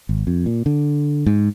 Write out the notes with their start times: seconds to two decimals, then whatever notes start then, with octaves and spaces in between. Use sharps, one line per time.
0.09 G#1
0.27 F2
0.46 A#2
0.66 D3
1.26 G#2